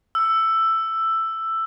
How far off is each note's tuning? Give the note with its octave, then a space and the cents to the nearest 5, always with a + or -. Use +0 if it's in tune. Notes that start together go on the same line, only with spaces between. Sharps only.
E6 +10